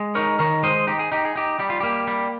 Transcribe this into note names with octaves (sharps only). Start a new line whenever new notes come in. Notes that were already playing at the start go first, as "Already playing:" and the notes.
Already playing: G#3
D#4 A#4 C#5
D#3 A#4 C#5
G#3 C5 D#5
D#4 G4
G#4
D#4 G4
G#4
D#4 G4
G3 G4
F4
A#3 G4
G3